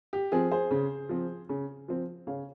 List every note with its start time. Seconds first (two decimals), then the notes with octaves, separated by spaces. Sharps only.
0.13 G4
0.32 F3 C4 G#4
0.51 G#4 C5
0.71 C#3
1.09 F3 C4
1.49 C#3
1.88 F3 C4
2.27 C#3 C#5 F5